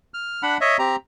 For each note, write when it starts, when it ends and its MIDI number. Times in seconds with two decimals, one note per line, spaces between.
0.14 0.43 89
0.43 0.57 62
0.43 0.57 78
0.43 0.57 83
0.61 0.77 73
0.61 0.77 75
0.61 0.77 76
0.79 0.96 60
0.79 0.96 67
0.79 0.96 82